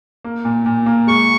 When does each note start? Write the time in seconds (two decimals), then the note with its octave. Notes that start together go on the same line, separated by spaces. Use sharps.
0.24 A#3
0.45 A#2
0.66 A#2
0.86 A#3
1.07 G#3 C#6